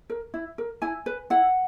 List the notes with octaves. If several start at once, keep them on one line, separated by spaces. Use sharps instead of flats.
A#4
E4
A#4
E4 G#5
B4
E4 F#5